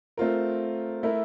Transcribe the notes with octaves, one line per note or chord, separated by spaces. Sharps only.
A3 C4 F4 A#4
A3 E4 A#4